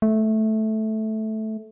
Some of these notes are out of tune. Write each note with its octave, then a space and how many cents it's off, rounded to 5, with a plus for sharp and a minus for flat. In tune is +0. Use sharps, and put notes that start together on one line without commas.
A3 -10